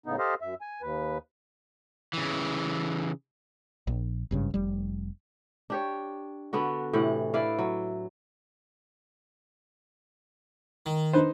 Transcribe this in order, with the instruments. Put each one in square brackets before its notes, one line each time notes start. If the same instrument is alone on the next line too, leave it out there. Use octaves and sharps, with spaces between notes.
[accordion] A2 C#3 B3 D#4
G4 A4 C5 D#5 F5
F#2 E5
G#5
D#2 B4
[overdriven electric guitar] C#3 E3
[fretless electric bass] A#1
G#1 G2 C#3
F1 G3
[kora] D4 G4 C#5
D3 B3 D4 F#4
A2 C3 E3 F#5
E4 B4 D5 F5
F#3
[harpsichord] D#3
[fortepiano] D#4 B4 C5